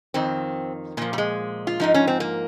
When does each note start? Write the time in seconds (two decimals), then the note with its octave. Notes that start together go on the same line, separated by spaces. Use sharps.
0.14 F2 D#3 C4
0.97 A#2 F3 A#3
1.13 G3
1.18 G#3
1.67 F4
1.80 G#2 F3 D#4
1.94 C#4
2.07 C4
2.20 A#3